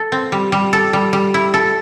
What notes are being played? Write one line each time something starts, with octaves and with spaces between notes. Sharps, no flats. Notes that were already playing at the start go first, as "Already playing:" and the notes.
Already playing: A4
C4
G3
G3
A4
G3
G3
E4
A4